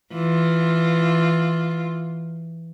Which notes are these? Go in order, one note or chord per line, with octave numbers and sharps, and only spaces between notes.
E3 F4